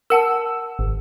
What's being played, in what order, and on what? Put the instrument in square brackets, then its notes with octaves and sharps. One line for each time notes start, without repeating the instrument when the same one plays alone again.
[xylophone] A#4 F#5 A5 [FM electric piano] E6
[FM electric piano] G#1